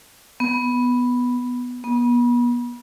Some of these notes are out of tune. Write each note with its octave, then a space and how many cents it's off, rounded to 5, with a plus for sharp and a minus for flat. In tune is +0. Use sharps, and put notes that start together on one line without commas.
B3 -5
B3 -35